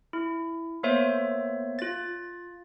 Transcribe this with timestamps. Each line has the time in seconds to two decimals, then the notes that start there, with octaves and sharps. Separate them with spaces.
0.13 E4
0.83 A#3 B3 C5 C#5 E5
1.79 F4 A6